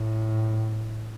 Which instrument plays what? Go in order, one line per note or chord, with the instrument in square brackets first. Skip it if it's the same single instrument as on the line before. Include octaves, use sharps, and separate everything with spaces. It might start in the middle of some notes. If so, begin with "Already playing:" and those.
Already playing: [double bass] A2